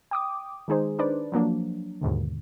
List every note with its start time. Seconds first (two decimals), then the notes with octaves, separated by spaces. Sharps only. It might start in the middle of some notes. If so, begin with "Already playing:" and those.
0.11 G5 D6 D#6
0.68 D#3 G#3 D#4 G#4 C5
0.99 D4 D#4 B4 C5 D5
1.32 F3 F#3 A#3 D4
2.01 D#2 G#2 B2 D3